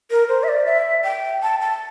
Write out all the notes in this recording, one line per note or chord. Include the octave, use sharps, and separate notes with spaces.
A#4
C5
E5
D5
E5
G5
A5
A5